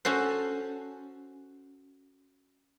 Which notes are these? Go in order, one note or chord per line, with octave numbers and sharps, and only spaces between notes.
C#4 F#4 A4 C5